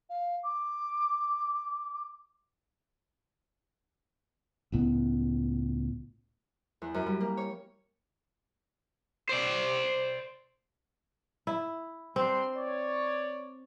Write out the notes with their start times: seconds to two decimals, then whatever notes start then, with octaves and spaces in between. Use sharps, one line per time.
0.10 F5
0.43 D6
4.72 C#2 A2 B3
6.82 E2
6.94 F#2
7.06 G3
7.20 A#3
7.37 C#5
9.29 C5 D5
11.47 E4
12.16 G3 C4 D4 C6
12.55 C#5 D5